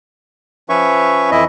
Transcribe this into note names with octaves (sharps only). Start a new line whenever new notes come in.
F3 C#4 B4 C#5 E5 C#6
F2 E3 E4 D#5 E5